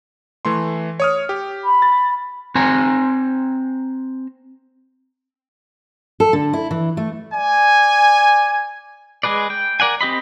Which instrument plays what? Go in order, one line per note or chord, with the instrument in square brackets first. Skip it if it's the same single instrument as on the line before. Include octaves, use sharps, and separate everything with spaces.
[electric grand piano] E3 A3 C6
C#5 D#6 F6
G4
[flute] B5
[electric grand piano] A6
[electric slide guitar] C4 G#5 A#5
[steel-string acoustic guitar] A4
D3
E4
E3
A3
[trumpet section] D5 G#5
[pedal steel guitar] G#3 G#4 B4 D5
G5
A#4 D5 F#5 G#5
C4 G4 D#5 B5